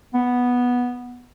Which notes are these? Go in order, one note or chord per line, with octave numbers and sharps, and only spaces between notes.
B3